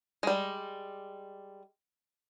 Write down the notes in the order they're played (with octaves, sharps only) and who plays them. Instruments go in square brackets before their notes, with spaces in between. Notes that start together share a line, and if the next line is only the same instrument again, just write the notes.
[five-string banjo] G3 G#3